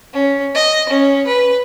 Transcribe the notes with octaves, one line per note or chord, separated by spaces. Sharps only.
C#4
D#5
C#4
B4